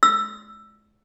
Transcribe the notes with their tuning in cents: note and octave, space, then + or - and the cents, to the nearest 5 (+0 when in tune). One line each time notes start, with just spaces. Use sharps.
E6 +10